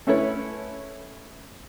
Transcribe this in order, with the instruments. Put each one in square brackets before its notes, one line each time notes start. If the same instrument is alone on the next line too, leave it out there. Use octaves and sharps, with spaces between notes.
[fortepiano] A3 C#4 E4 A4 B4 C#5